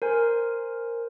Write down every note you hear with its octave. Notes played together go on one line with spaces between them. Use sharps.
A#4 C5 G#5